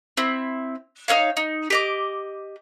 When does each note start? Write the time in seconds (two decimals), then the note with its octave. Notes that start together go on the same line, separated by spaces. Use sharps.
0.17 C4 E4
1.08 D#4 A#4 C#5 F5
1.37 D#4
1.70 G4 D#5 D6